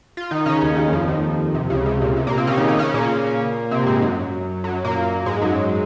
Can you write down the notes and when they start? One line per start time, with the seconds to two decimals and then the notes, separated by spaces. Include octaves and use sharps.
0.17 F4
0.31 D#3 D#4
0.46 C#3 C#4
0.62 D#2 D#3
0.77 D#2 D#3
0.92 F2 F3
1.08 D#2 D#3
1.54 C3
1.70 C#2 C#3
1.86 C3
2.02 A#2
2.17 C3
2.27 A#2 A#3
2.37 C3 C4
2.47 C#3 C#4
2.57 D#3 D#4
2.68 D#3 D#4
2.78 C#3 C#4
2.94 A#2 A#3
3.71 C3 C4
3.87 G#2 G#3
4.02 F#2 F#3
4.64 F#2 F#3
4.85 A#2 A#3
5.26 G#2 G#3
5.42 F#2 F#3